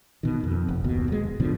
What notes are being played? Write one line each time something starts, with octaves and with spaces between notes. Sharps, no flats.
B2 D#3
F2
F1
F#1 D#2 B2
E1 G#3
G#2 B2 D3 F3